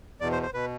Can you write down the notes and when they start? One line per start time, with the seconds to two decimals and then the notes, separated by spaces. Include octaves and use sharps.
0.20 E2 B2 D5
0.32 C5
0.43 C5
0.54 B2 B4